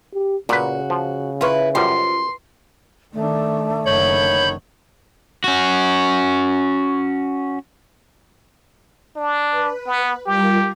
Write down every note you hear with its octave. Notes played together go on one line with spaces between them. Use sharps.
G4
A#2 C#3 F#4 B4
F3
E4 F4 B4 C#5
F#2 F3 G3 C6
D#3 A3 D4
F#1 D3 D#3 C#5 B5 G6
C#4 F#4
D4
B4
B3
G3 F4 G4 A#4